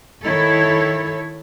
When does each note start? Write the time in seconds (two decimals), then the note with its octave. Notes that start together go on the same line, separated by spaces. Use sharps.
0.24 D#3 E4 A4 C#5